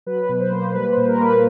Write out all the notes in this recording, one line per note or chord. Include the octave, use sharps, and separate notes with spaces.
F#3 B4
B4
B2
C5
A#3
C5
G3 B4
C5
A#2
A#4
A#3
B4